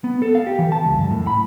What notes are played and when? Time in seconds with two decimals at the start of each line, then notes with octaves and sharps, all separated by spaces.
0.04 B3
0.22 A4
0.35 F5
0.47 G4
0.59 E3
0.72 A5
0.85 C#2
0.98 F#2
1.11 A2
1.27 B5